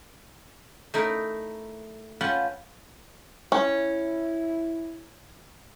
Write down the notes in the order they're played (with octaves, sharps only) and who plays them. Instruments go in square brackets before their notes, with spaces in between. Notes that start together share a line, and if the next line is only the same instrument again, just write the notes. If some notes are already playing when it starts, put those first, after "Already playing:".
[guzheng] A3 D#4 E4 A#4
C#4 F4 B4 F#5 G5 A5
[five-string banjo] C#4 [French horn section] E4